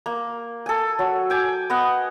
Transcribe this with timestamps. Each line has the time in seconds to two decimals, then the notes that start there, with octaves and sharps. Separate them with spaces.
0.06 A#3
0.66 A4 G#5
0.99 F#3
1.30 G5 G#5 D6
1.70 B3 D#5 F#5